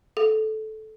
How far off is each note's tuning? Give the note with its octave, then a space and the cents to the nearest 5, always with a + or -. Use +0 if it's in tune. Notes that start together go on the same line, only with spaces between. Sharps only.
A4 -15